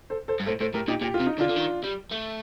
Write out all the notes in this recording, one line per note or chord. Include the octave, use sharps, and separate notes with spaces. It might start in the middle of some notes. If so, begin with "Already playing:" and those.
A4 C5
A4 C5
G2
A2 A4 C5
A2 A4 C5
A2 G4 A#4
A#2 D#4 G4
A#2 G4
F4
C3
D#4
D3 D4 F4
D3
D#3
G3
A3